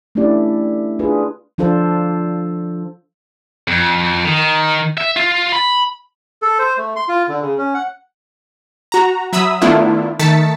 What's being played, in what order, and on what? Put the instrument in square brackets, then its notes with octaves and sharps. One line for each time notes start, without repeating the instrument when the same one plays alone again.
[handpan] A3 C#4 D4 E4 G4 D5
D4 F4 G#4 B4
F3 D4 F4 A4 C5
[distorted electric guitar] F2
D#3
E5
F4
B5
[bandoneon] A4
C5
A3
C6
F4
D3
C#3
C#4
F#5
[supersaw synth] F#4 A#5
F#3 E5 B5 D#6 E6
D#3 A3 B3 D4 E4 F4
D#3 A3 A5 A6 B6 C#7